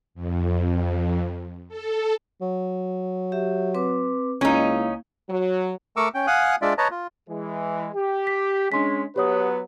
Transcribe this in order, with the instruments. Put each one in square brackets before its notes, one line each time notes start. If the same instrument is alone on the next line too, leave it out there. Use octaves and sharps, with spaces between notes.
[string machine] F2
A4
[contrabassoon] F#3
[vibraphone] G4 E5
C4 B4 D6
[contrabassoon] C#2 [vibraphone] A#3 E4 F5 [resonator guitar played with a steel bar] C#4 D#4
[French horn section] F#3
[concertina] A3 A#4 C#6 D6 E6
C#4 G5
F5 F#5 G#5 D#6 F#6
G#3 D4 F4 D5 E5
B4 C#5 D#5 A5 A#5
F4
[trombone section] E3 G#3
G4
[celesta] B6
[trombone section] G#3 C#4 [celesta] D4 C6 B6
[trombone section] F#3 B3 B4 [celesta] G4 C#5 D#6